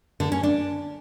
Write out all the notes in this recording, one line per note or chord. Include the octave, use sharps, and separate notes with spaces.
D3
C#4
D4